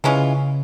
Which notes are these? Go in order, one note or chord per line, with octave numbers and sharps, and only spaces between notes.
C#3 E3 G#3 C#4 F4